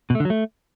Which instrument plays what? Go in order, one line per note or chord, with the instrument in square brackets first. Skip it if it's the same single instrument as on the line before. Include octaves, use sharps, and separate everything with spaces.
[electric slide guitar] B2
A3
D3
F#3
A3